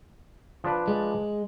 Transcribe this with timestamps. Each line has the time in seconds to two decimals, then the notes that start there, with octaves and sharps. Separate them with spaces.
0.64 F3 D4 B4
0.88 G#3